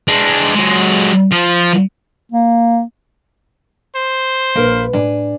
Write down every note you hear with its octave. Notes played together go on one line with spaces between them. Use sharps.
G#3 D4
F#3 G#3
F3
A#3
C5
A#1 A#3 A#4 B4
A2 D4 E4 G#5